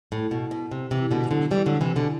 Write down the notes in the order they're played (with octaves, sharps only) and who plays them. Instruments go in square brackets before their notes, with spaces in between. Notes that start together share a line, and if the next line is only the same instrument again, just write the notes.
[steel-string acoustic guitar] A2
B2
B2
C3
C3 E3
B2 D3
E3
D3 F#3
E3 G3
D3 F#3
C3 E3
B2 D3